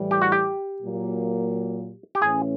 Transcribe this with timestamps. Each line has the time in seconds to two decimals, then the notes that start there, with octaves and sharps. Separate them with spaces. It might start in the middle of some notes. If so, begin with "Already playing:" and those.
Already playing: A2 E3 G3
0.11 G4
0.22 F#4
0.32 G4
0.82 A#2 F#3 A#3
2.15 G4
2.21 A2 E3 A3 C#4 G#4